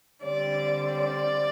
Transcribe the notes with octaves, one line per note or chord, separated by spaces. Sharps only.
D3 G3 C4 D5
D5